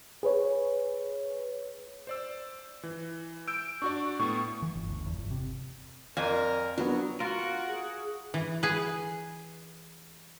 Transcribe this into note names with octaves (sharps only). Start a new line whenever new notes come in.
G#4 B4 C#5
C5 D5 E6
E3
E6 G6 D7
D4 F#4 D5 C#6
A2 A3 B3 C#6
E3
G1
D2
E2
G1
C3
F2 A#4 D5 G#5
F#3 B3 D4
F4 F#4 A#4 F#5
G#4
E3
G#4 B4